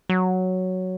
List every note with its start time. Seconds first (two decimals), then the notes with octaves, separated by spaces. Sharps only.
0.10 F#3